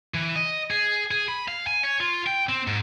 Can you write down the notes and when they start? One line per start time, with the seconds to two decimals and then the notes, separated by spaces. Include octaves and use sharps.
0.14 E3
0.36 D#5
0.71 G#4
1.11 G#4
1.28 B5
1.48 F5
1.67 G#5
1.83 C#5
2.01 F4
2.27 G5
2.49 C4
2.67 G#2